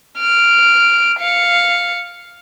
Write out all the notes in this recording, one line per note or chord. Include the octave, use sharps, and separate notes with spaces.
F6 D7
F5 C#7